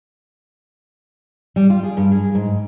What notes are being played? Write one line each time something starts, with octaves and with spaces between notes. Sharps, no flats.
G3
F4
G#4
G2
G#4
G#2